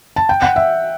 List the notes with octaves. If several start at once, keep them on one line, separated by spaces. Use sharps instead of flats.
A5
G5
F#5
E5